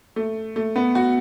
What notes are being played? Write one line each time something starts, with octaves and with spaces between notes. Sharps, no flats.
A3
A3
B3
F#4